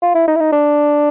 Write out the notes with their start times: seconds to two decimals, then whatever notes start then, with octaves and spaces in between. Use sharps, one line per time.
0.02 F4
0.15 E4
0.28 D#4
0.36 E4
0.40 D#4
0.53 D4